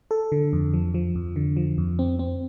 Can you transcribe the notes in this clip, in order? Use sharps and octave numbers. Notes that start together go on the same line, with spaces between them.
A4
D3
F2
F3
F3
F2
D3
F3
F2
C4
C4